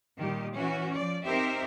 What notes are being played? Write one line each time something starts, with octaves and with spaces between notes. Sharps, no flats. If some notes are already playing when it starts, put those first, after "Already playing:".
A#2 D#3 G3 G4
E3 C#4 F#4
F3 D5
C4 D#4 G4 A#4 C5 E5